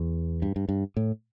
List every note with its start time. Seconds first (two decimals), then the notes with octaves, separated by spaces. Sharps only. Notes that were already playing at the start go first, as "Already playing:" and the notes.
Already playing: E2
0.42 G2
0.56 G2
0.69 G2
0.97 A2